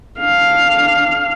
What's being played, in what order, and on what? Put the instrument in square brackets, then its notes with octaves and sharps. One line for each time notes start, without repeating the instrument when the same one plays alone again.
[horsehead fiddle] D4 F5